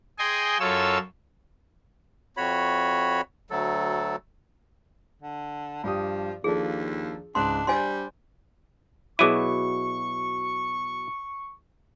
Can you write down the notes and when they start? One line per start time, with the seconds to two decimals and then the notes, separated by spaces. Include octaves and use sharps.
0.19 G#4 D#5 G5 G#5 C6
0.60 F#2 F4 A4 C#5 E6
2.37 F2 F#4 C#5 B5
3.50 D2 F#3 A4
5.22 D3
5.84 G2 F3 G4 D#6
6.44 D#2 F3 D4 G#4 A4
7.35 C#2 G#2 D4 C6 F#6
7.67 G3 D4 C5 G#5 C6
9.19 B2 F#3 E4 G#4 C#6 D6 D#7